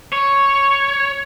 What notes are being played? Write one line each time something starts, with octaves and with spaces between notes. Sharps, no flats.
C#5